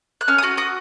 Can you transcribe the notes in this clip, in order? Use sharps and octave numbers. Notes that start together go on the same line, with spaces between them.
F#6
C#4 F6
D#6
F#4 F6
F#4 D#6